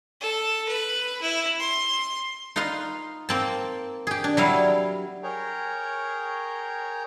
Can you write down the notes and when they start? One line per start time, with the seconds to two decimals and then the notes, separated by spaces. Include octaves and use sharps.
0.20 A4
0.68 B4
1.21 E4
1.59 C6
2.56 D#4 F4 B4 F5 C6
3.29 A#3 C4 A5
4.07 G4 G#4
4.24 D4
4.37 F#3 G3 E4 F5
5.23 G#4 A#4 C#5 G5 A#5